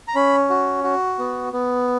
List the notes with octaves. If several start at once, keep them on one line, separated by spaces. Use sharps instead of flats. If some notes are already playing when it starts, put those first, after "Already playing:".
A#5
C#4 B5
F#4
F#4
B3
B3